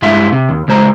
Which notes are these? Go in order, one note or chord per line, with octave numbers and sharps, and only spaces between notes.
G2 G#3 E4 E5 F5 C6
C3
D#2
C#2 G#3 C5 A#5